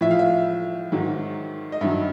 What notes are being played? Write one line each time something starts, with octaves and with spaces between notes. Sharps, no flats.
A2 F3 E5
F5
E5
G#2 D#3 F#3
D#5
G2 D#3 F#3 E5